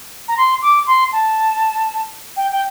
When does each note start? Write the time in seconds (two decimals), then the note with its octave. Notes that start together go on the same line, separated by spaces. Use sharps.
0.28 A#5
0.37 C6
0.62 D6
0.87 C6
1.13 A5
2.36 G5
2.51 G5